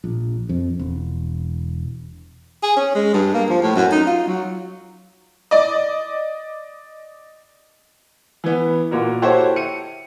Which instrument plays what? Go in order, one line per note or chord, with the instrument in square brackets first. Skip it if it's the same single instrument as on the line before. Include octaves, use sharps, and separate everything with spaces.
[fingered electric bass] A#1
F2
E1
[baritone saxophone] G#4
C#4
G#3
G2
A#3
F3
A2
F#2
D#4
F4
F#3
[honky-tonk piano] D5 D#5
[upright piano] E3 B3
A#2 F#4 A#4
E4 F#4 G4 A4 C5 C#5
C#7 D#7